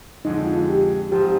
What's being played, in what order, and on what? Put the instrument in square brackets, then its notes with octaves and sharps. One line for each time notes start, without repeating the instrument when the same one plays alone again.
[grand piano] F2 D3 G#3 [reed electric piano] D#4
[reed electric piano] F4
G4
[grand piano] G#2 F3 C4 F4 [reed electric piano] G4